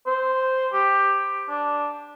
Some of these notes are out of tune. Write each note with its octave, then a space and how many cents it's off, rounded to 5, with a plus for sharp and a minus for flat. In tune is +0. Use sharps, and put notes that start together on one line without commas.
C5 -5
G4 +10
D4 -5